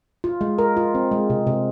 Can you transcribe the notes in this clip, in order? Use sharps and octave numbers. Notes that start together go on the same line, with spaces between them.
F4
G#3
A#4
F4
C4
G#3
C3
C3